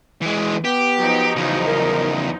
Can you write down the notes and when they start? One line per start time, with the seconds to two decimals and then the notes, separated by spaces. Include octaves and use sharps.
0.22 E3 G#3
0.65 B3 G4
0.99 F3 F#3 D#4
1.36 E2 C#3
1.67 A#4